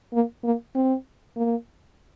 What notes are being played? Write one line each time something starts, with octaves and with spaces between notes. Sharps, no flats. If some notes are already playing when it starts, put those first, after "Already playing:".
A#3
A#3
C4
A#3